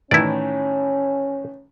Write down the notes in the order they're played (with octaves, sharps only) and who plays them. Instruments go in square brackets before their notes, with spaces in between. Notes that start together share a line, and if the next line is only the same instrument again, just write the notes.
[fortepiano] A2 D#3 E3 [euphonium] C#4 [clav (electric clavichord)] E4 D5